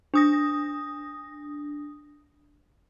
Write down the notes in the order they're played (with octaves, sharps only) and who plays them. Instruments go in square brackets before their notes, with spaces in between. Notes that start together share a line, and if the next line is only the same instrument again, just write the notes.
[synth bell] D4 D#6 A#6